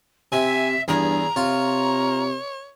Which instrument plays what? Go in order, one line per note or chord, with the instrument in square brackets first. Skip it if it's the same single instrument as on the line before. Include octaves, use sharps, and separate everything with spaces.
[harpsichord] C3 [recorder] E5 [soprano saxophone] G#5
[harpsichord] E2 [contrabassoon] G2 [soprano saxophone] G#4 [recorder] A#5
[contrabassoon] C3 [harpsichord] F4 [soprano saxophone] C#5